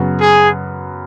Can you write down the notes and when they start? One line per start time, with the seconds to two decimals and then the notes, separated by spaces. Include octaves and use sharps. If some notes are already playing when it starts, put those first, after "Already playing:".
Already playing: F#2 C#3 B3 F#4
0.20 G#4